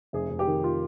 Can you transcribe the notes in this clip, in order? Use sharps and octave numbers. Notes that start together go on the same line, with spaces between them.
F1 G#4
F1
G4
D#3
F4